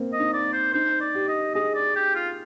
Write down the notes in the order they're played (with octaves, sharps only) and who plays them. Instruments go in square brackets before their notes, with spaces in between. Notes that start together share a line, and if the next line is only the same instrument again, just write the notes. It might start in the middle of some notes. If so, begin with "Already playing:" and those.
Already playing: [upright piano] A#3 C4
[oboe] D#5
[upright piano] D#4
[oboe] D5
C5
[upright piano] D#4 [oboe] C5
[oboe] D5
[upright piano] G4
[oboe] D#5
[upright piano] G#4 [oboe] D#5
[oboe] D5
G4
F4